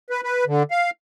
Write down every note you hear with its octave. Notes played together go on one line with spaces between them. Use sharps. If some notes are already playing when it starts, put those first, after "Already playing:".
B4
B4
D3
F5